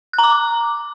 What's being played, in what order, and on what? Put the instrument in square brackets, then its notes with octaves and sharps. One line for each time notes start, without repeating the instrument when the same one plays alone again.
[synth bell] F#6
A#5
D6